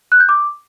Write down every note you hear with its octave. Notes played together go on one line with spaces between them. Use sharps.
F#6
G6
D6